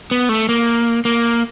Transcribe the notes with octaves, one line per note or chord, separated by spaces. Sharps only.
B3
A3
A#3
A#3